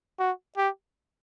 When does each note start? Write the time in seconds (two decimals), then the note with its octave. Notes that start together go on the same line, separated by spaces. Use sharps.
0.20 F#4
0.57 G4